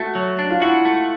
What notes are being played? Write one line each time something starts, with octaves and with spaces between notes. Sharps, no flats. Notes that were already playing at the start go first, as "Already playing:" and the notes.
Already playing: A3 F#4
F#3
D4
F4
E4 F#4
A3